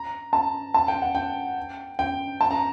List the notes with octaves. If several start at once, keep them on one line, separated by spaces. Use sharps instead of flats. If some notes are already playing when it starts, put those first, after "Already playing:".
Already playing: A#5
A5
A5
G5
F#5
G5
G5
A5
A#5